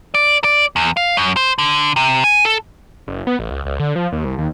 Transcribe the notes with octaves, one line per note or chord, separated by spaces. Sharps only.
D5
D5
E2
F5
F#2
C5
D3
C3
G#5
A4
F#1
B3
A1
C#2
C#2
D3
F3
D#2
C2
D#2